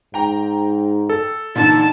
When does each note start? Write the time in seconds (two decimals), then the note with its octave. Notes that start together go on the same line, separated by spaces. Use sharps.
0.14 G#2 G5 A#5
1.09 A4
1.56 A#2 D3 E3 D#4 A5 A6